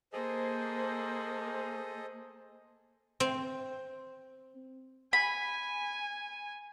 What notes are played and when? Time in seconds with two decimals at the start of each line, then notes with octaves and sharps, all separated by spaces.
0.13 A#3 G#4 A4 C5 D#5
3.20 C4
5.13 G#5 B5